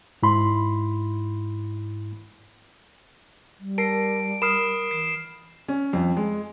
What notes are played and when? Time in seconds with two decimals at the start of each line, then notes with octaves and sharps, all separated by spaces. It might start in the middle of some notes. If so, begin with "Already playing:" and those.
0.23 G#2 E4 B5 C6
3.59 G3
3.78 A#4 A5 A#6 C7 D7
4.42 A#4 B5 D#6 F6 C7 E7
4.91 E3 C7
5.68 C#4
5.93 F2
6.17 G#3